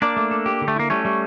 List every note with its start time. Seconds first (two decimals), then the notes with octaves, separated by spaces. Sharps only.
0.02 A#3 D4 D5
0.17 A3
0.31 A4
0.46 G4
0.62 D3
0.68 A3
0.76 A#3 E4
0.90 G3 A3 C#4
1.05 G3